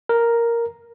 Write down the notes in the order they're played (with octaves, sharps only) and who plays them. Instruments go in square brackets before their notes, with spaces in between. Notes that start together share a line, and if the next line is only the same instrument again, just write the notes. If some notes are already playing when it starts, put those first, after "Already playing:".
[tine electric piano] A#4